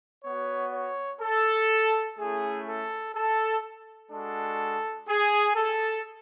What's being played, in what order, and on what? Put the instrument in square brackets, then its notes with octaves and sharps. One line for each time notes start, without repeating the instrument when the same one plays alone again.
[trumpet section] B3 F#4 C#5
C#5
A4
A3 C#4 E4 G#4
A4
A4
G#3 D4 F#4 A4
G#4
A4